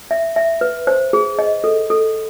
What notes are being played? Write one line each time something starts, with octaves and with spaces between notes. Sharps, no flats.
E5
E5
B4
C5
G#4
D#5
A4
A4